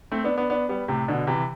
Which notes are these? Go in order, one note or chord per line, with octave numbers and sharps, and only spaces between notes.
A3 C4
B3 D4
B3 D4
B3 D4
G3 B3
A2 C3
B2 D3
C3 E3